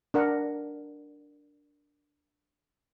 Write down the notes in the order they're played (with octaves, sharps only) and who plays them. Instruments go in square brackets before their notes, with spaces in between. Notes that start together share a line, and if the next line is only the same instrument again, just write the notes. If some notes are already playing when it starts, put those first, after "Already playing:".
[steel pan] D4 A#4 F#5